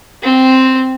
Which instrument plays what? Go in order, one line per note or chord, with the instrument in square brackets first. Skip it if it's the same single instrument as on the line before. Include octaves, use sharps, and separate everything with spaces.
[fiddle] C4